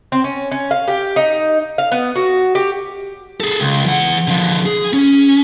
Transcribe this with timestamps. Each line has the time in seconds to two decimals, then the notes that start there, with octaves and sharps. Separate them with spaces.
0.12 C4
0.24 C#4
0.51 C#4
0.71 F5
0.88 G4
1.16 D#4
1.78 F5
1.92 B3
2.16 F#4
2.55 G4
3.40 G#4 A4
3.61 C#2
3.86 E3 F#5
4.28 D3 F3
4.66 G#4
4.93 C#4